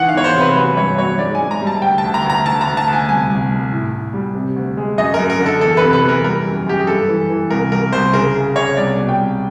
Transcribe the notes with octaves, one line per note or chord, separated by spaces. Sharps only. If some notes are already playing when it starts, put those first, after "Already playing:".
Already playing: D#3 E3 F#5
F5
E2 C#5
C5
C3
B4
F#3 B4
G2 C#5
F#3 C#5
G#2 D5
G#5
G#2
A#5
G3
A5
D2 G5
A5
D2
A#5
D2
A#5
D2 A5
A#5
D2
A5
D2
G#5
C2 G#5
C2
C2
A2
A2
G3
C3
D2
G#3
F#2 D#5
A#4
F#2
A#4
D3
A4
E2 A4
C3 B4
B4
E2
A#4
G3 A#4
F#2
F#2 G4
G#4
G2 A4
E3
E3
C2 A#4
C2 A#4
C2 C5
C#3 A#4
C#3
C#3 C#5
C2 D5
B2
G5
C2